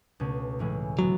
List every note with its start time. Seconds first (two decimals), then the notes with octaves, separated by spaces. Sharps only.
0.20 C#2 B2 A3 C#4
0.59 A2 E3 G#3 C#4 E4
0.99 D3 F#3 G#3 B3 E4